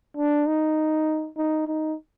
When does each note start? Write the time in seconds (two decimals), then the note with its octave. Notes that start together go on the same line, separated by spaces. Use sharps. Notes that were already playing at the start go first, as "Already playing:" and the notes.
0.17 D4
0.47 D#4
1.37 D#4
1.68 D#4